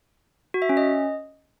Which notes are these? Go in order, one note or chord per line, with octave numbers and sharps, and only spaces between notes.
F#4
E5
C#4
D#5